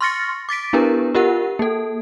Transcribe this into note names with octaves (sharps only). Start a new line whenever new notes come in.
C6 C#6 F6 A6 A#6 C#7
D6 A6 B6 D7
B3 D4 E4 G4 A#4 B4
F4 G4 A#4 F#5
A#3 A4